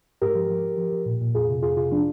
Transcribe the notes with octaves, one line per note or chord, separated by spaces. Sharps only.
G#2 G4 A#4
F3
F3
F3
F3
F3
A#2
A#2
F2 F4 G#4
C3
F2 F4 G#4
C3 F4 G#4
F3 D4 F4